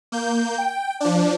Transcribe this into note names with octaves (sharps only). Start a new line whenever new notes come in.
A#3 G6
G5
F3 D4